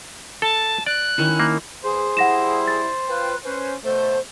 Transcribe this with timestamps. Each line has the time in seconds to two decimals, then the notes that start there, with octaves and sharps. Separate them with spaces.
0.42 A4 A5
0.86 D5 F#6
1.18 D#3 C#4 E4
1.40 A#3
1.83 E2 G#4 C5
2.17 G3 E4 F#5 A#6 E7
2.67 A6
3.08 F4 B4 G5
3.44 C#4 B4 C5
3.84 B2 A3 C5